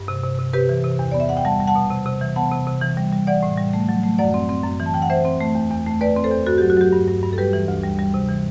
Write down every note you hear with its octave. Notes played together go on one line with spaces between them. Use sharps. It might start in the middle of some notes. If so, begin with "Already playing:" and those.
Already playing: G2
C3
C3
C3
C3 G4 B4
E3
C3
E2
B3 D5
E5
B3 F#5
G5
G3 F#5 A5
G3
F#5 A5
B2
C3
C3
E3
B3 F#5 A5
C3
C3
E3
G3
G3
E3 D5 F#5
A2
G3
A3
F#3
A3
F#2 D5 F#5
C4
C4
F#2
E3
A5
E3 G5
F#5
E3 C5 E5
C4
A3
E2
E2
A3
E2 B4 D5
C4
A4 C5
E2
G2 F#4 A4
G4
F#3
F#4
F#3 G4
G2
G2
G2
A4
G3 G4 B4
E3
D2
G3
G3
C3
E3